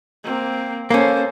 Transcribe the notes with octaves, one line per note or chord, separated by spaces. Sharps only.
A#3 C4
A#3 C#4 A4 C5